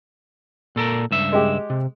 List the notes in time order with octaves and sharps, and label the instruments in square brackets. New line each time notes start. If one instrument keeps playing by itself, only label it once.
[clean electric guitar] A#2 A4 A#4
C#2 G2 E5
[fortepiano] G#3 G4
[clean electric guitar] C3